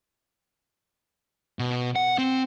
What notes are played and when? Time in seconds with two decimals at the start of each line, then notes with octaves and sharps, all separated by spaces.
1.59 B2
1.96 F#5
2.18 C4